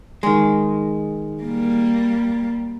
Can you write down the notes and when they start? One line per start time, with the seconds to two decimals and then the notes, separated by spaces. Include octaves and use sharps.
0.23 D#3 G#3
1.42 G3 A#3